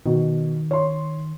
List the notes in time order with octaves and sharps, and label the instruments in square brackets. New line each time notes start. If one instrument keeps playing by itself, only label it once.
[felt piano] B2 [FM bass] D#3
[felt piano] C#5 C6